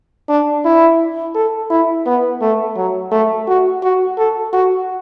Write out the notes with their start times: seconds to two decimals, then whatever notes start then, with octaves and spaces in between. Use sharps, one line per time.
0.29 D4
0.65 E4
1.35 A4
1.70 E4
2.06 B3
2.41 A3
2.76 F#3
3.12 A3
3.48 F#4
3.83 F#4
4.18 A4
4.53 F#4